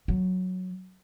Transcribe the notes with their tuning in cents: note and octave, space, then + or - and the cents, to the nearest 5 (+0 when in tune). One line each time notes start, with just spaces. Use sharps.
F#3 -5